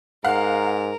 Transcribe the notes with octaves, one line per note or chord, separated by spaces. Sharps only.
G#2 A#4 F5 F#5